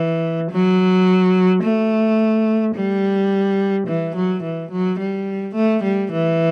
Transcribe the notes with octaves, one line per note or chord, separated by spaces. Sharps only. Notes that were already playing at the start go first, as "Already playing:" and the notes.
Already playing: E3
F#3
A3
G3
E3
F#3
E3
F#3
G3
A3
G3
E3